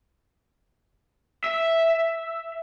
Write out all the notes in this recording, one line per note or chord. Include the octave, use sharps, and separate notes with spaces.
E5